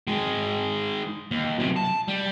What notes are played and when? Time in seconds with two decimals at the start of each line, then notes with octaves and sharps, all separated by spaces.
0.07 D#3 G#3
1.31 D#2
1.59 F#2 C3
1.76 A5
2.08 G3